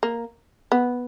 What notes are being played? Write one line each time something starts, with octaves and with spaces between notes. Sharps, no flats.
A#3
B3